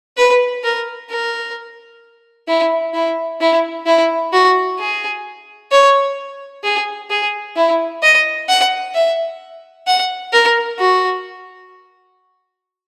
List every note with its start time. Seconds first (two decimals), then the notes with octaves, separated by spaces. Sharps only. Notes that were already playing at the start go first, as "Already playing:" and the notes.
0.18 B4
0.64 A#4
1.10 A#4
2.48 E4
2.94 E4
3.41 E4
3.86 E4
4.33 F#4
4.79 G#4
5.71 C#5
6.64 G#4
7.10 G#4
7.56 E4
8.03 D#5
8.49 F#5
8.94 E5
9.87 F#5
10.33 A#4
10.79 F#4